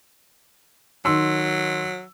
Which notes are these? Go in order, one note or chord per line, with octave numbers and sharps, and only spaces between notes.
D#3 F#3 C6 E6